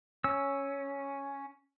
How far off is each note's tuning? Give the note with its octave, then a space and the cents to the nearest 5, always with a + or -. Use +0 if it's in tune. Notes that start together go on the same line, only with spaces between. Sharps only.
C#4 +0 E6 +0